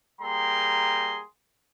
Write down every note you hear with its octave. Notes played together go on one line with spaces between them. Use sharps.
G3 A#3 G#4 G5 A#5 C6